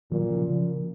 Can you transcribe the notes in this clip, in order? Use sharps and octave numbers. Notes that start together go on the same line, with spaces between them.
A#2 D#3 F#3
C#3 F3
C#3 F3